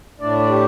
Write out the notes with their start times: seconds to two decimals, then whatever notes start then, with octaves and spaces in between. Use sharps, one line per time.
0.19 A2 A3 D4 D5
0.39 D5
0.49 G4